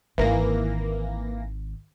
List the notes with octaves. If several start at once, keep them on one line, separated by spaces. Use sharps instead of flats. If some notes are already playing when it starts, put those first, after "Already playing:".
G#1 D#3 E3 A#3 A#6